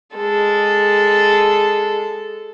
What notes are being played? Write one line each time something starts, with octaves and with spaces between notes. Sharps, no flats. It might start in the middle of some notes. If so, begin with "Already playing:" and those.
G#3 A4